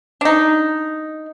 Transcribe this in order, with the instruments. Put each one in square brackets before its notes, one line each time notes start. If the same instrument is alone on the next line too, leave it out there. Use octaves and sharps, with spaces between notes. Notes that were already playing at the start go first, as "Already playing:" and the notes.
[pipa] D4 D#4